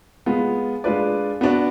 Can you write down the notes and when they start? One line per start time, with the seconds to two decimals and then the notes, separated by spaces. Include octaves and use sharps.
0.26 G#3 B3 F4
0.84 G#3 D4 F4 B4 D5
1.41 B3 D4 F#4 D5